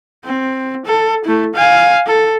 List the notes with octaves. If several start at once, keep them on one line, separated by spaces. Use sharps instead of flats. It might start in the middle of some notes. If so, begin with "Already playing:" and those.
C4
A4
A3 E4
F5 G#5
A4